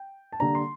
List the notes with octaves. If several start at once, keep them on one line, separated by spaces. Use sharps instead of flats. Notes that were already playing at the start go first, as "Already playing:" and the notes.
Already playing: G5
A5
D3 G3 A#3 D4 A#5
C6